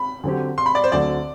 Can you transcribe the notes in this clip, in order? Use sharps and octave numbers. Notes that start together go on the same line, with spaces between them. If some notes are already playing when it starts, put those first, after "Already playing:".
Already playing: B5
D3 F#3 C4 G4
C6
B5
D5
C5
D2 D3 F#3 C4 D5